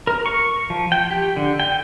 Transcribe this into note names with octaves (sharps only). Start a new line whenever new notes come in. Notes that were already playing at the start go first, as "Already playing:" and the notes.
A#4
C#6
F3
G5
G4
D3
G5